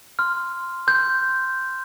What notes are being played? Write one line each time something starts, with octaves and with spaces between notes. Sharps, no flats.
C6 F6
C6 F6 G6